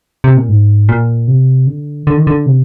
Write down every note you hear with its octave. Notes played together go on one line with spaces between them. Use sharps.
C3
A#2
G#2
A#2
C3
D3
D3
D#3
D3
C3